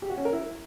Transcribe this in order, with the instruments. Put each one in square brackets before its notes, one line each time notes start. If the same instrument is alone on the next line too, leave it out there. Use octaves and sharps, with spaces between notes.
[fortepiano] G4
F#4
C#4
A#4
E4